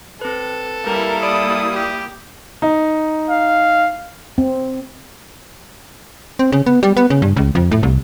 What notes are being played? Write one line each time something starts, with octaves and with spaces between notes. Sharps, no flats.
C4 A4 B4
G3 A#3 E4 A#4
D5 B5 D#6 D7
G4
D#4
F5
C4
C4
C#3
B3
G3
B3
C#3
G2
C#2
F2
A2
C2